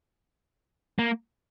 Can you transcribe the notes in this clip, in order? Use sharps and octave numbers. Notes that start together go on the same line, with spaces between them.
A#3